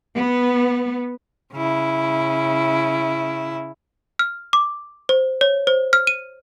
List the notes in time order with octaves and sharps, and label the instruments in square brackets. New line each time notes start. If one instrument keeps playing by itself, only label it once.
[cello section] B3
[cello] C#3 E4
[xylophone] F6
D6
C5
C#5
C5
F6
D#7